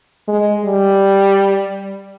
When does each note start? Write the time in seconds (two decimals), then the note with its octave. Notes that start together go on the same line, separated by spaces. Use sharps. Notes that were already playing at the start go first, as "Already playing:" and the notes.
0.28 G#3
0.64 G3